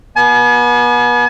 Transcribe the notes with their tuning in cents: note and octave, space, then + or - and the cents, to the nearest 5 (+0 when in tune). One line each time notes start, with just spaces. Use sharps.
B3 -35 G#5 +40